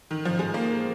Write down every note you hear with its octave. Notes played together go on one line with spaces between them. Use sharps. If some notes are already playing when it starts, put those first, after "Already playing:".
D#3
F3
G#3
A#3